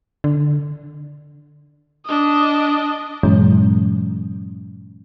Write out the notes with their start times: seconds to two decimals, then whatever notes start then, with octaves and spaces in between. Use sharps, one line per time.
0.24 D3
2.06 D4 D#5
3.23 G2 A#2 E3 F#3 G#3 C#4